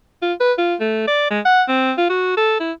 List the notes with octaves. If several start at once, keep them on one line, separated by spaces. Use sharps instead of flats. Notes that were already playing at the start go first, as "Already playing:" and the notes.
F4
B4
F4
A3
D5
G#3
F#5
C4
F4
F#4
A4
E4